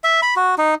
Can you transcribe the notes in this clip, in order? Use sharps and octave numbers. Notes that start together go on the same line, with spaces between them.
E5
B5
F#4
D#4